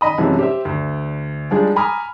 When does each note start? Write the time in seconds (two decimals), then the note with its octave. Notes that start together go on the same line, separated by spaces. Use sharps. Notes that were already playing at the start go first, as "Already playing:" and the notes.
0.01 D#3 D#5 B5 D#6
0.18 F#2 C3 E3 F3 G#3
0.39 G4 C5 E5
0.65 D2
1.51 F3 G3 G#3 D4 D#4 G#4
1.76 G#5 A#5 B5 D6 D#6 F6